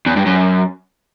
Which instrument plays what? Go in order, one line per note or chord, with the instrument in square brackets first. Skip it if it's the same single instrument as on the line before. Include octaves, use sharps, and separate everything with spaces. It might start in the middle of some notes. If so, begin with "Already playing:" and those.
[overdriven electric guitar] E2
G2
F#2